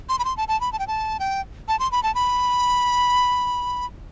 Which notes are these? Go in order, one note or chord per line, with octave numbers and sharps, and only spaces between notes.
C6
B5
C6
A5
A5
B5
A5
G5
A5
G5
A5
C6
B5
A5
B5